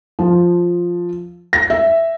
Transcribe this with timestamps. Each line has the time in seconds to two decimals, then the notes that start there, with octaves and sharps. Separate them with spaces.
0.19 F3
1.53 A#6
1.70 E5